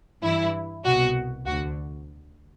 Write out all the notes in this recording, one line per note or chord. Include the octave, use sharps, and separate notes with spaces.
G2 E3 E4
C2 B2 F#4
D2 D3 F#4